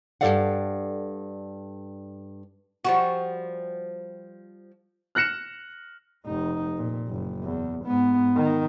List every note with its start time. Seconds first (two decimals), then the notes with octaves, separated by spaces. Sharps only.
0.21 G2 C#3 A4 D5 F5 F#5
2.85 F3 G3 F#4
5.15 F6 F#6 A#6 C#7 E7
6.26 F1 D#4
6.77 A#2
7.08 F#1
7.43 E2
7.85 G#2 B3
8.36 D#3